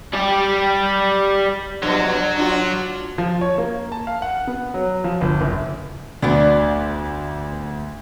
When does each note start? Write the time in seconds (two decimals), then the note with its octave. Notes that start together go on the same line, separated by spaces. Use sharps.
0.13 G3 G4
1.83 G2 B2 F3 F#3
2.37 D4 F4 F#4
3.18 F3
3.41 C#5
3.58 A#3
3.92 A5
4.07 F5
4.22 F#5
4.47 B3
4.74 F#3
5.04 F3
5.21 G1
5.41 F#1
6.22 D2 B3 D4